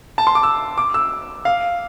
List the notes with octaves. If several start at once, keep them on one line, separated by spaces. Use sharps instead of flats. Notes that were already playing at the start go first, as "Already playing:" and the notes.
A5
C6
D6
E6
D6
E6
F5